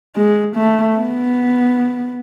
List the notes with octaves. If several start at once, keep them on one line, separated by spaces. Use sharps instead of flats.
G#3
A3
B3